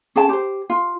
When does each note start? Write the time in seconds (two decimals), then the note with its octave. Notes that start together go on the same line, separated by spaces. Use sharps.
0.16 C#4 G#4 G5 A5
0.29 G4 C5
0.70 F4